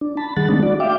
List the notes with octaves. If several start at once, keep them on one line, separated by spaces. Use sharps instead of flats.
D4
A5 B5
D#3 G3 G#4 F#5 A6
G#3 A3 C4 D4 D#4
F#4 D5
E5 F5 G5 D6